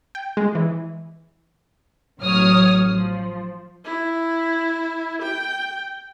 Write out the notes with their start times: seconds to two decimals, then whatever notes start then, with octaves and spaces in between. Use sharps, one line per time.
0.15 G5
0.37 G#3
0.55 E3
2.20 A1 F#3 C#5 D#6 F6
2.91 F3
3.85 E4
5.22 G5